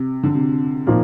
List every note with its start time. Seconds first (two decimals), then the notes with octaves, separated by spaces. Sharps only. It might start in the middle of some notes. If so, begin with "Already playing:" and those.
Already playing: C3
0.23 D3
0.35 C3
0.87 A#2 D#3 F3 A#3